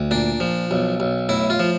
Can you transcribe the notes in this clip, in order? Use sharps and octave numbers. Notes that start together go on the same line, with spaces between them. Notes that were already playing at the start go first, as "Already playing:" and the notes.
Already playing: D2
A#2 D4
F3
B1
B1
A2 E4
F4
F3